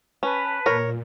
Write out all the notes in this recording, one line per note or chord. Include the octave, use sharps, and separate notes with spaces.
C#4 B4 A5
A#2 A#4 C#5